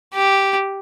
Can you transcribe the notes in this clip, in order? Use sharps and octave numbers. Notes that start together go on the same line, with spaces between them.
G4